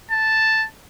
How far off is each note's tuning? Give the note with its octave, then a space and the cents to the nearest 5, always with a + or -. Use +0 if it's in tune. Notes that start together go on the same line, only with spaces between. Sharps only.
A5 +0